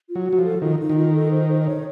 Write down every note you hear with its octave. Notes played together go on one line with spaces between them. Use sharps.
F4
F#3
F#4
F#3
F3
A4
D#3 F4
D#4
D#3
F4
A4
C5
C5
D#5
C#5